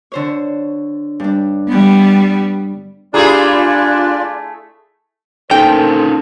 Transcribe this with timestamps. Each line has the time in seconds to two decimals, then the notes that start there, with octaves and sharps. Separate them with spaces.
0.12 D3 C5 C#5
1.20 G2 D4
1.68 G3 B3
3.14 A3 D4 E4 F4 G4 G#4 D5 A#5
5.51 D3 A#3 C#4 D#4 A4 A#4 C5 G5